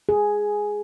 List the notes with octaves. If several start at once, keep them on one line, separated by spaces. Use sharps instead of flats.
G#4